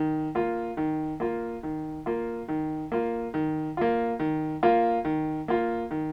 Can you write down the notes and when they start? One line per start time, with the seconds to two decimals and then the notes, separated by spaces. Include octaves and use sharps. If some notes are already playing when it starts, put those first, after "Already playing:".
Already playing: D#3
0.35 A#3 F4
0.77 D#3
1.20 A#3 F4
1.63 D#3
2.06 A#3 F4
2.49 D#3
2.92 A#3 F4
3.34 D#3
3.77 A#3 F4
4.20 D#3
4.63 A#3 F4
5.05 D#3
5.48 A#3 F4
5.91 D#3